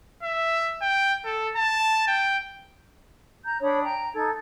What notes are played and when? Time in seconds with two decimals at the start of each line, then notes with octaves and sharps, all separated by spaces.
0.23 E5
0.81 G5
1.25 A4
1.56 A5
2.08 G5
3.45 A#5 G6
3.61 D4 C#5 B5 D#6
3.83 G5 A#5
4.14 D#4 A4 G#6